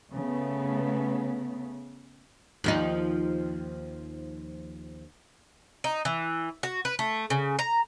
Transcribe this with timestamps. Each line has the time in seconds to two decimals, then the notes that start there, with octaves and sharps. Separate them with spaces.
0.11 C#3 A3 B3
2.64 D#2 F3 D#4
5.84 D#4
6.05 E3
6.63 F#4
6.85 B4
6.99 A3
7.30 C#3
7.59 A#5